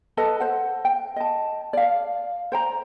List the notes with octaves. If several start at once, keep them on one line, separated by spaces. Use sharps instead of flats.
A4 B4 D#5 A5
C5 F#5
G5
D#5 A5
D5 F5
C5 G5 A#5